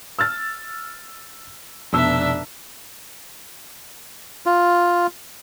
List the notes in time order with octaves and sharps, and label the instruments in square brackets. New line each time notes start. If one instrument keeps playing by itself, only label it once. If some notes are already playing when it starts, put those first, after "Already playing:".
[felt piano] E6 F6 A6
[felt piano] F1 B2 E6 [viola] D4 E5
[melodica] F4